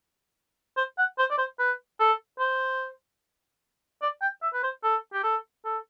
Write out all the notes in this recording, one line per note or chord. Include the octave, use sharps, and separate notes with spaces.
C5
F#5
C5
D5
C5
B4
A4
C5
D5
G5
E5
B4
C5
A4
G4
A4
A4